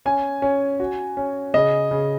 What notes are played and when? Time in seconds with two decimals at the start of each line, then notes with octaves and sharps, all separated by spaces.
0.05 C#4 G#5
0.42 C#4
0.80 F#4
1.17 C#4
1.54 C#3 D#5
1.91 C#3